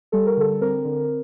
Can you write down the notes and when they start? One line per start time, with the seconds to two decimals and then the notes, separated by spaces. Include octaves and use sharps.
0.12 G3 A4
0.27 A#4
0.37 D3 A4
0.61 C4 A#4
0.85 D3